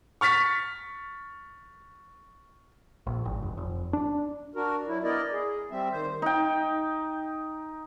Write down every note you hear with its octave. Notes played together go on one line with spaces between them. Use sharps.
C#6 F6 A6 B6
A#1
G#1
F1
F1
D4
D4 F#4 A#4
F#3 E4
B3 D4 E4 A#4 D5 D#5
G#4
G3 C4 E5
D#3 C5
D#4 G5